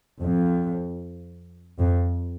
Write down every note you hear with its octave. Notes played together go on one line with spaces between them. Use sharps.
F2
F2